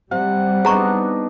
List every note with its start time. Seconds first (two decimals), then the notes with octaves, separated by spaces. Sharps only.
0.11 C3 G3 F#5
0.65 B3 D4 D#4 G#4 A#5 C#6